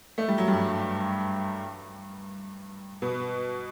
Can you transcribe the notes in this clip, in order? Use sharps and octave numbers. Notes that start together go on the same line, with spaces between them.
A3
G3
F#3
G2 G3
B2 B3